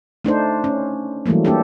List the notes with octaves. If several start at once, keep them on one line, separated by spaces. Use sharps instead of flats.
A3 D4 D#4 C5
C#4
E3 F#3 G3 A3 A#3
A#3 D4 G4 A4